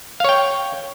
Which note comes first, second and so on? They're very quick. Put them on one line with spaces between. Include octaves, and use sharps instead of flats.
F5 C#5 G5